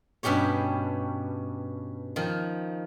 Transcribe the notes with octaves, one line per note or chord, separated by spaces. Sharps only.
G2 B2 C#4 G4 C#5
D#3 F3